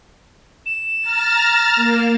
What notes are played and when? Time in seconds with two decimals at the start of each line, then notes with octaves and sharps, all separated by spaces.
0.66 E7
1.01 A#5 F6 A6
1.76 A#3